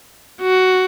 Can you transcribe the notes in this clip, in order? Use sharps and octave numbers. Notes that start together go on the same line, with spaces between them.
F#4